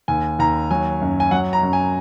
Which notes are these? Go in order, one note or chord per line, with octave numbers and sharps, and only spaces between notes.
D#2 G#5
D#2 A#5
F#3 G#5
F#2
G#5
F#3 F#5
A#5
F#2
G#5